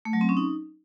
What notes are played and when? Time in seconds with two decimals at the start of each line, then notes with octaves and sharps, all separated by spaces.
0.05 A3
0.13 F#3
0.21 C4
0.29 C#4
0.37 D#4